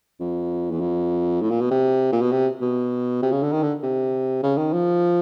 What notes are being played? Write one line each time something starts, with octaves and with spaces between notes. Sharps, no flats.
F2
E2
F2
A2
A#2
B2
C3
A#2
B2
C3
B2
C3
C#3
D3
D#3
D3
C3
C#3
D#3
F3